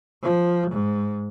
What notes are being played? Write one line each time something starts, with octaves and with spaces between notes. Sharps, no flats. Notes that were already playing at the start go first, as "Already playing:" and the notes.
F3
G#2